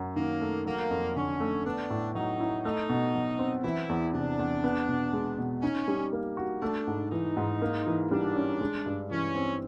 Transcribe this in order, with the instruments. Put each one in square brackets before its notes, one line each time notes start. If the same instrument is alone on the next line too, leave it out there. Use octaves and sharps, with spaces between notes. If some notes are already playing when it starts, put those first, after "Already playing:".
Already playing: [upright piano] F#2 F#3
[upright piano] D#3 [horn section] A#3
[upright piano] A3
[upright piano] F#3 [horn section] A#3
[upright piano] F2
[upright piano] D3 [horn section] C#4
[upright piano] A3
[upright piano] B3 [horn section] D4
[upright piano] A2
[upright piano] F#3 [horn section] D#4
[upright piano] E4
[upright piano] A3 [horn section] D#4
[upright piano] B2
F#3
C4
[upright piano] E3 [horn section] E4
[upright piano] E2
[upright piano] C3 [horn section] D4
[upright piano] E2
B3
B2
G#3
B2
[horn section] C#4 [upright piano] D#4
[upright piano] G3
A#3
F#4
[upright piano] A3 [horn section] D4
[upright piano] G#2
[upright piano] E3 [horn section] D#4
[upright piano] G#2
A#3
E3
[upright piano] G3 [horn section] D4
[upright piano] C#4
G#3
G2
[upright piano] E3 [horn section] C#4
[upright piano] C4